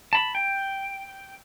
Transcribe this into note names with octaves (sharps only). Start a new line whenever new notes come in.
A5 B5
G5